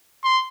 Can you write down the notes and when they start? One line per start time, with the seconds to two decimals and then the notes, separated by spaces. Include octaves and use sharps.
0.24 C6